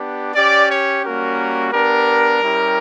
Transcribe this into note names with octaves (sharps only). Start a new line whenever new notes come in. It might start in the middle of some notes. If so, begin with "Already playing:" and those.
Already playing: B3 D4 G4
C#4 G4 D5
C#5
G3 A#3 C#4 F#4 A#4
B3 D4 G4 A#4
G3 C#4 E4 G4